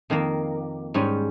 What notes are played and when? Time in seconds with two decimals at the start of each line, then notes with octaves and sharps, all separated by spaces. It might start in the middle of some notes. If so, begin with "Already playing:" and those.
0.10 F2 D#3 A#3
0.94 G#2 G3 C#4